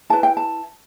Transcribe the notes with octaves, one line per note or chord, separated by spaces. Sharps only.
E4 B4 A5
G5
A5